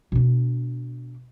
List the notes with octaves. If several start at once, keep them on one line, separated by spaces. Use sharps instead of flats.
B2 D4